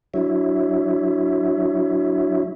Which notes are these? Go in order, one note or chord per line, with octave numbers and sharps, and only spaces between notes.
F#3 D4 E4 F#4 C#5 E5